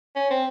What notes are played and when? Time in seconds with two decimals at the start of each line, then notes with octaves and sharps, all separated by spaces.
0.16 C#4
0.31 C4